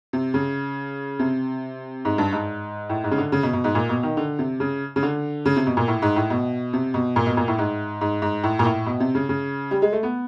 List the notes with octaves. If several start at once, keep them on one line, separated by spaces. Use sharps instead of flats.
C3
C#3
C3
G#2
G2
G#2
A2
G#2
C#3
D3
C#3
B2
B2
G#2
A#2
B2
D#3
D3
C3
C#3
C#3
D3
C#3
C3
B2
A#2
A2
G#2
A2
B2
C3
B2
A#2
B2
A#2
A2
G#2
G#2
G#2
A2
A#2
A2
B2
C3
C#3
C#3
G3
G#3
A3
B3